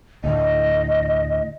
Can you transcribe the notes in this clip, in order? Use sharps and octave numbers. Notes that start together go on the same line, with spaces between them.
D2 A2 D#5